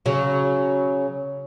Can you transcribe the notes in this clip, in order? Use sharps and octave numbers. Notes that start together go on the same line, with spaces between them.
C#3 F#3